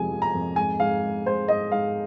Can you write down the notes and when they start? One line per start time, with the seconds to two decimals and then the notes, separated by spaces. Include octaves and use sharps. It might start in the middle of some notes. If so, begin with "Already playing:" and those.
Already playing: F2 C3 F3 G#3 G#5
0.11 F3
0.22 A#5
0.34 F2
0.56 G#2 G#5
0.80 G#2 F5
1.03 G#3
1.26 G#3 C5
1.48 G#2 D#5
1.72 G#2 F5